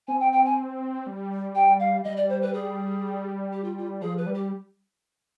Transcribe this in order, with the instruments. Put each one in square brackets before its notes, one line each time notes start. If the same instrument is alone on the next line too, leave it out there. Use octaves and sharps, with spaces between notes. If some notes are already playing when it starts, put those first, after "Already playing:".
[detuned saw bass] C4 [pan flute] G#5
[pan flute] G5
G5
G#5
[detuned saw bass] G3
[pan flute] G5
F5
[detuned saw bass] G3 [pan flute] D#5
[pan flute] D5
C5
B4
G#4
G4
F4
F4
[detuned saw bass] F3 [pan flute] G#4
[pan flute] B4
[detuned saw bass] G3
[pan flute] G4